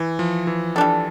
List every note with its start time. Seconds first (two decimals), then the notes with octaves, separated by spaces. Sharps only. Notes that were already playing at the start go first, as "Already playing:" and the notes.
Already playing: E3
0.19 F3
0.47 E3
0.76 G3 D4 A4